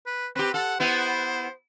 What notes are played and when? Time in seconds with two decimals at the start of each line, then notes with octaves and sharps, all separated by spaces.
0.06 B4
0.36 C4 G4 B4
0.54 A4 F#5
0.80 B3 E4 C5